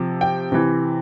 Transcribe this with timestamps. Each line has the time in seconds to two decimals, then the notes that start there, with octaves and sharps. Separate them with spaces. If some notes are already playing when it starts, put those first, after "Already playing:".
Already playing: C3 F3
0.21 G5
0.52 C3 E3